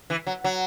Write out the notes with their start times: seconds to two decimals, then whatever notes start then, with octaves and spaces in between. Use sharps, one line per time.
0.10 E3
0.27 F#3
0.44 F#3